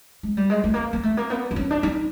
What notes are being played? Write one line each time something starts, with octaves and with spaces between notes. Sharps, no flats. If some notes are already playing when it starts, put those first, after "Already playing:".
G#3
G3
G#3
A3
A#3
A#3
A3
A#3
B3
D4
C#4
D4
D#4